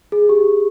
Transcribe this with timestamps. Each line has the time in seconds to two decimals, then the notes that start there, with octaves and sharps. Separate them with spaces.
0.12 G#4
0.29 G4